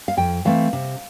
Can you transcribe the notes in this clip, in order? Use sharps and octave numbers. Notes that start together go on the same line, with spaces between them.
F5
F2 G5
E3 A3 C4 F5
C3